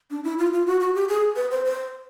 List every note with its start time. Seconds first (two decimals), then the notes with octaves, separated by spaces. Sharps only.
0.11 D4
0.24 E4
0.38 F4
0.53 F4
0.67 F#4
0.80 F#4
0.95 G4
1.09 G#4
1.36 B4
1.51 C5
1.65 C5